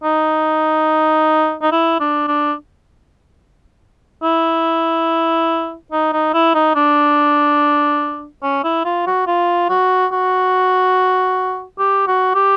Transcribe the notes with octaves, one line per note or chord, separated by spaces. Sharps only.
D#4
D#4
E4
D4
D4
E4
D#4
D#4
E4
D#4
D4
C#4
E4
F4
F#4
F4
F#4
F#4
G4
F#4
G4